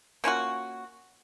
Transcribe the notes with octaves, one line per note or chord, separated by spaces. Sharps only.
A#3 C#4 F4 F#4